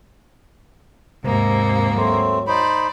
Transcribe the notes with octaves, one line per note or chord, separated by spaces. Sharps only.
D#2 G#2 C3 A#3
F#3 A3 C4
D#4 C5 D5 B5